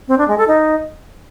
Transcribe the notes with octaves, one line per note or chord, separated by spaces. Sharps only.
C4
D4
G#3
A4
D#4